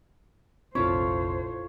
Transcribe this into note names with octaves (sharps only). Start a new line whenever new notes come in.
F1 A#1 C4 E4 F4 A4 C5 C#5